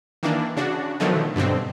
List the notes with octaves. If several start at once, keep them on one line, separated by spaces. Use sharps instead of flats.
D#3 E3 A#3 D4
C#3 D4 F#4
B2 D3 D#3 F3 F#3 A3
G2 B2 D3 C4